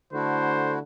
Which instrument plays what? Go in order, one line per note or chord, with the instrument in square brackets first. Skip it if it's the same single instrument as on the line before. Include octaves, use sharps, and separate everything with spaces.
[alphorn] D3 [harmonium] A3 E4 F#4 [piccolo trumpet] C5